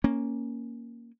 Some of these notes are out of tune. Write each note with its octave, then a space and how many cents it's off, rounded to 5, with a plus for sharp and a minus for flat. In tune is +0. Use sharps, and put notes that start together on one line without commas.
A#3 +0 C#4 +0